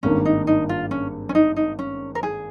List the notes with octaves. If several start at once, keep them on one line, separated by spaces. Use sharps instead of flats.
G#1 G2 D#3 A#3 C#4
D#4
D#4
F4
C#4
C#4
D#4
D#4
C#4
A#4
G#4